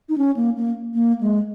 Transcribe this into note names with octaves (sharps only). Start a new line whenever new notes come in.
D#4
C#4
A#3
A#3
A#3
G#3